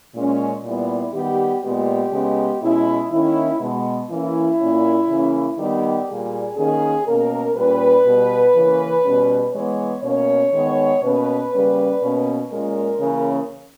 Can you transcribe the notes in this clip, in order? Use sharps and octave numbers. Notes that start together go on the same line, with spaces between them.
A#2 G#3 C#4
A#2 G3 B3 E4
D#3 G3 B3 G4
A#2 G#3 B3 G4
C#3 G#3 B3
B2 G#3 C#4 E4
D#3 A#3 C#4 E4
B2 G#3 B3
E3 A#3 C#4 E4
A#2 A#3 C#4
C#3 E3 A#3 C#4
D#3 G3 B3 G4
A#2 G3 A#3 G#4
D#3 A#3 C#4 G#4
B2 A#3 C#4 A#4
A#2 G3 C#4 B4
B2 G3 B3
C#3 E3 A#3 C#4
B2 G3 C#4
E3 G#3 B3 C#5
B2 A#3 C#4 C#5
D#3 G#3 B3
B2 A#3 C#4 B4
C#3 G3 A#3 C#4
B2 A#3 C#4
A#2 G#3 C#4 A#4
C#3 E3 A#3 C#4